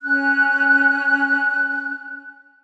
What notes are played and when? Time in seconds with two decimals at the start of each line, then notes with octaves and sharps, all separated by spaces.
0.02 C#4 F#6